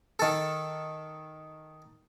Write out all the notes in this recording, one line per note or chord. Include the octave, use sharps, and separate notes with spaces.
D#3 A4